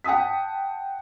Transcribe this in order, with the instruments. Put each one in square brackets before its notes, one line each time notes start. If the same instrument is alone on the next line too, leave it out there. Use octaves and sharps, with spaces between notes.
[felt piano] F#5 G5 A5 D#6 B6